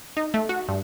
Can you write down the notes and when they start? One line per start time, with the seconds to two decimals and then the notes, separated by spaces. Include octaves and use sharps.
0.17 D#4
0.34 A3
0.49 F#4
0.68 G2